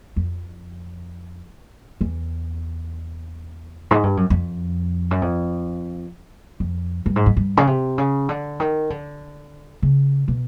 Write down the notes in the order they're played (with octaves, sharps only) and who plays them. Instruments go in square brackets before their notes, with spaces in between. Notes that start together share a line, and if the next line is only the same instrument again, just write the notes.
[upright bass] F2
E2
G#2
G2
F#2
F2
F#2
F2
F2
G2
G#2
G2
G2
C#3
C3
C#3
D3
D#3
D3
C#3
B2